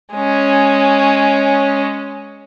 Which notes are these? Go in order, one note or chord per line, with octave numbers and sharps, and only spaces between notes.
G#3 C#4